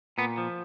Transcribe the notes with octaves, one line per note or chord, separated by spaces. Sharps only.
A#2 B3
F3